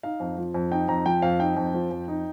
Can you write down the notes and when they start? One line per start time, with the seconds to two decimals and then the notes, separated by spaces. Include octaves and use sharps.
0.03 D#4 F5
0.20 F2
0.38 F3
0.54 F2
0.72 D#4 G5
0.88 F2 A#5
1.06 F3 G5
1.22 F2 F5
1.39 D#4 G5
1.57 F2
1.74 F3
1.91 F2
2.08 D#4